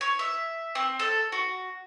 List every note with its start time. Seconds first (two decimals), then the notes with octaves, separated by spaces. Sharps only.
0.01 C#5
0.19 E5
0.75 C4
0.99 A4
1.32 F#4